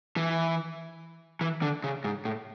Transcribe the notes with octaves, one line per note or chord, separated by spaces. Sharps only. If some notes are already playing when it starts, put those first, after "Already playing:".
E3
E3
D3
C#3
G#2
A2